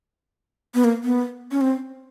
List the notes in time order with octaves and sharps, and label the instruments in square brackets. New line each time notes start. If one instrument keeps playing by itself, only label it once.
[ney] B3
A#3
B3
C#4
C4